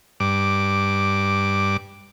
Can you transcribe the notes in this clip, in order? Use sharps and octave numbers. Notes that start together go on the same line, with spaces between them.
G2 D6